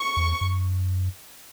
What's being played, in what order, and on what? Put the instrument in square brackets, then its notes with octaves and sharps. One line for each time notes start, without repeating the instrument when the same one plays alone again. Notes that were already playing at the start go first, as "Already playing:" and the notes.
Already playing: [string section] C#6
[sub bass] E2
F#2